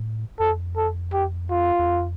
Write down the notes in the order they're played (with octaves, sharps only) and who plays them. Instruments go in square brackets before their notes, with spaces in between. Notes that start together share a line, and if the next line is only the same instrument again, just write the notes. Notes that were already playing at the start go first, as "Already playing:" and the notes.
Already playing: [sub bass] A2
[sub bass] F2 [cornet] A4
[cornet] A4
G4
F4
[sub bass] E2
F2